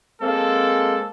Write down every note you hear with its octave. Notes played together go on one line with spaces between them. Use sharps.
G#3 A#3 C4 A4